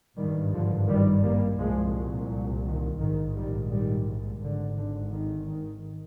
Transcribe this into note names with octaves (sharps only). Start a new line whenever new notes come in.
G#1 G2 D#3 G3
D3 F3
D#3 G3
G3 A#3
C2 A#2 F3 G#3
D#3
A#1 G#2 D#3
D#3 G3
D#3 G3
G#1 G#2 D3
D3
D#3
D#3